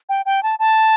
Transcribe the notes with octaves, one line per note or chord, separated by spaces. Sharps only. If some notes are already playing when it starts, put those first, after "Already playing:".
G5
G5
A5
A5